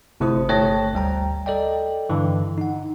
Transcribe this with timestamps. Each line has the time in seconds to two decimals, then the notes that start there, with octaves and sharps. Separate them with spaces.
0.20 G1 C3 A3 E4 C5 D#6
0.49 G1 A3 C#5 G5 A5 A#6
0.94 D2 G3 G5 A#5
1.46 A4 D5 D#5 G5
2.10 G2 D3 E3
2.58 D#4 F#5